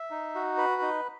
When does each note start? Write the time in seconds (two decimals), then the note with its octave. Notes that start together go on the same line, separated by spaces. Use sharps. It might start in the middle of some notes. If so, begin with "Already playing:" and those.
Already playing: E5
0.11 D#4
0.35 F#4
0.57 B4
0.82 D#4